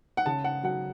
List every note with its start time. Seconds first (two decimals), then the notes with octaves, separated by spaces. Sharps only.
0.17 F#5
0.26 C#3 A5
0.44 F#5
0.63 F#3 F#5